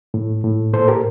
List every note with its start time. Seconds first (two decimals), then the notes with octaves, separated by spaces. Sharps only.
0.14 A2
0.44 A2
0.73 A#2 A4 C5
0.88 G4 A#4